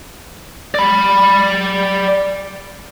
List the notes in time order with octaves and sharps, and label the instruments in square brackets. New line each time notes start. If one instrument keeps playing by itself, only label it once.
[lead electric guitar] D5 B5